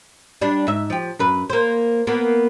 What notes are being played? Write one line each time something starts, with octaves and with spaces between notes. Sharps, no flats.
G3 D4
G#2 E5
F3 G4
F#2 B4
A#3 C5
A#3 B3